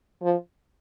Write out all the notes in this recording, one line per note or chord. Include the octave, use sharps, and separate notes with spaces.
F3